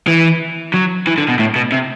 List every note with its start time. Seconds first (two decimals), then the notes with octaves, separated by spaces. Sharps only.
0.08 E3
0.74 F#3
1.07 E3
1.18 D3
1.28 B2
1.39 A2
1.56 B2
1.72 C3